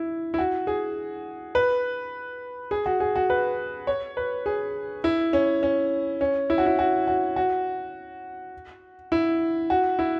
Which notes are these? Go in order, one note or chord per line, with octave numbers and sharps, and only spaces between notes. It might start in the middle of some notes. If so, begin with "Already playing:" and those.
Already playing: E4
E4
F#4
G#4
B4
G#4
F#4
G#4
F#4
B4
C#5
B4
G#4
E4
C#4
C#4
C#4
E4
F#4
E4
F#4
F#4
F#4
E4
F#4
E4